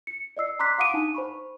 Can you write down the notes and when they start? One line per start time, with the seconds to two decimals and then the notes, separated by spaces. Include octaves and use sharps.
0.07 C#7
0.37 D5 D#5 E6 C7
0.59 A#5 C6 D6 F#6 B6 C7
0.78 F5 F#5 D6 D#6 D7 D#7
0.94 D4 D#4 G#5 A5
1.14 C5 B5 C#6